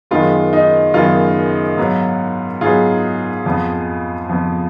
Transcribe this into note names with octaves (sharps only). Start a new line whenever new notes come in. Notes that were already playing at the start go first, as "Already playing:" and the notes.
F#2 D#3 G#3 B3 F4
D#4
F#2 D#3 G#3 B3 F4
G#2 F#3 B3
G#2 F#3 B3 F4 G#4
F2 F3 B3
F2 F3 B3